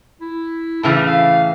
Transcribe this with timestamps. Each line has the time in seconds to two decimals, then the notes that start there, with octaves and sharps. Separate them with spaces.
0.21 E4
0.83 A2 C#3 E3 A5
1.06 F5